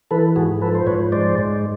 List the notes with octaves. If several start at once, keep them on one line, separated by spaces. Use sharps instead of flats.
E3 A4 B4
G#2 F#4 G#4
F3 A4 B4
C5
G#2 B4 C#5
G#3 C5 D5
G#2